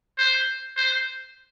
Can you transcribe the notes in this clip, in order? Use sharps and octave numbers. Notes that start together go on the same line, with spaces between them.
C5
C5